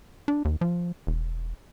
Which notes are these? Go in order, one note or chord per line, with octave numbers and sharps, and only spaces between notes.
D4
D#2
F3
E1